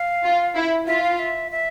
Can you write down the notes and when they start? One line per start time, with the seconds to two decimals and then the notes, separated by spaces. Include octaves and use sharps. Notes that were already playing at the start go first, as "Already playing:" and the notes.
Already playing: F5
0.24 F4
0.55 E4
0.87 F4 E5
1.04 F5
1.19 E5
1.51 E5